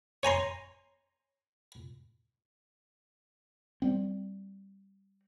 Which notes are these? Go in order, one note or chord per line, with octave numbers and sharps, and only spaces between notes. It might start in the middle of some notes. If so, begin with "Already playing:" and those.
C#5 G#5 A#5 C6
G3 C4